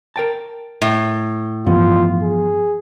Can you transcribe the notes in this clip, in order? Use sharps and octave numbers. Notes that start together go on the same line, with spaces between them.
A#4 G5 A5
A2
G2 E3 F3 B3 F4
G#4